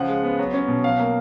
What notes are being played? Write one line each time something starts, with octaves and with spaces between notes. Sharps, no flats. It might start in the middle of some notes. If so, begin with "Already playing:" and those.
Already playing: C#3 F3 F#5
G#3
B3
F#3
C#4
B2
F#3 F5
A#3